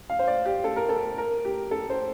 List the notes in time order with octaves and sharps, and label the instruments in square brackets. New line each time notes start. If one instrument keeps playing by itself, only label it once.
[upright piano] F5
C5
D5
G4
A4
A#4
A4
A#4
G4
A4
C5